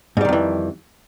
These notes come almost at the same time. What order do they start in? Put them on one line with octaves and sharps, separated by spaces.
G#2 G3 D#3 F2 E3